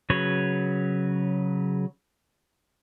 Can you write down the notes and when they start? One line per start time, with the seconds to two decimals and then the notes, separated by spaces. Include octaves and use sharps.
0.10 C#3 F#3 B4 C#5